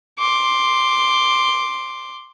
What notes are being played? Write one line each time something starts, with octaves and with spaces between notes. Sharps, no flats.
C6 D6